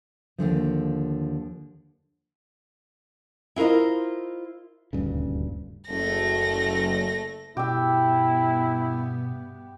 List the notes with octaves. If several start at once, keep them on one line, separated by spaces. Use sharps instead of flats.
D#2 A2 D3 F3
E4 F4 A#4 C5 D#5
D#1 D2 G2 C#3
F#1 A3 A#6
G2 B2 B3 E4 G4 E5